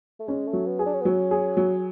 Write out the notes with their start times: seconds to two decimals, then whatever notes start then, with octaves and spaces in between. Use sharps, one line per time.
0.20 A3
0.27 G#3 C#4
0.47 A3
0.53 F#3
0.66 B3
0.79 G#4
0.86 D4
0.93 C#4
1.01 B3
1.05 F#3 C#4
1.31 G#4
1.57 F#3